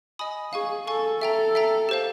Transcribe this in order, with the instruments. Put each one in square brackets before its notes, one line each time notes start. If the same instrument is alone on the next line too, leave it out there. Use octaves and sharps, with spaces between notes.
[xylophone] D#5 G#5 B5 D#6
[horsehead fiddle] G#4 [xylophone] F5 G#5 C#6
[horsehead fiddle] A4 [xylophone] F5 G#5 C#6
[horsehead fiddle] A4 [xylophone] E5 G5 A#5
[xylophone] E5 G5 A#5
G4 C5 F5